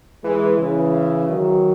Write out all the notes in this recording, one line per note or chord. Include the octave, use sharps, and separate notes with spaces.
E3 G#3
C#3 E3
D#3 F#3